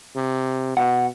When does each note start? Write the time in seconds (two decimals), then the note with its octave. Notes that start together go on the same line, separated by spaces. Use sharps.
0.16 C3
0.77 B2 F#5